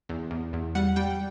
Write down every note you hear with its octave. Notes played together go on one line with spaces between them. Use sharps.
E2
E2
E2
G3 F#5
G3 G5